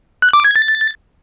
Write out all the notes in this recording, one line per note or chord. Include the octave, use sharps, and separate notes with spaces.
F#6
D6
G#6
A6